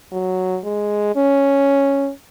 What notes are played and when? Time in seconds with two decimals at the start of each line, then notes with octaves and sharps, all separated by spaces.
0.12 F#3
0.64 G#3
1.16 C#4